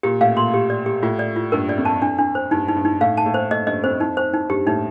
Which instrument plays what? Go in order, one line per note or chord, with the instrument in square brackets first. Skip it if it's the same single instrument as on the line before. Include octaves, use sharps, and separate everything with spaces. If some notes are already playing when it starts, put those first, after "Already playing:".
[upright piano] A#2 [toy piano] G4
[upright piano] A2 [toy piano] F5
[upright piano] A#2 [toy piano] C6
[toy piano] G4
D5
G4
[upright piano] A2 [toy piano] F4
[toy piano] D5
F4
[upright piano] G2 [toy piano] A#4
[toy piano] D5
[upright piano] F2
[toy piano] A5
D4
D4
C5
[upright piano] G2 [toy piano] D#4
[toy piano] D#4
[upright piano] G2
[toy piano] D#4
[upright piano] A2 [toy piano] F5
[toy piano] A5
[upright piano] A2
[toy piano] C5
[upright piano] A2 [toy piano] D#5
[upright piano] G2 [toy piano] D#5
[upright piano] F2 [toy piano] C5
[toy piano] D#4
C5
D#4
[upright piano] G2 [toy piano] G4
[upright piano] A2 [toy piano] D#4